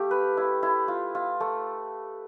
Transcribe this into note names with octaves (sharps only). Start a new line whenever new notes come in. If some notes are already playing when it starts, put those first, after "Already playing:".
Already playing: A3 G4 F5
B4
E4
E4
F4
F4
A3